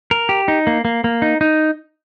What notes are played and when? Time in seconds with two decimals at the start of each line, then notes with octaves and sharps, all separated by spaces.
0.11 A#4
0.29 G4
0.48 D#4
0.67 A#3
0.85 A#3
1.04 A#3
1.22 D#4
1.41 D#4